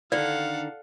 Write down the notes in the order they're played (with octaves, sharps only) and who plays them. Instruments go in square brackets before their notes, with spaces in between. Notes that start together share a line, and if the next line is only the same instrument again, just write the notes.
[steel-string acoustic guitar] D3 D#3 [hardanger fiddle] A4 F#5 [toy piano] D5 [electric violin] F5